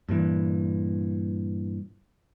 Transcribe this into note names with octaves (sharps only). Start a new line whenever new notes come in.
G2 A#2 E3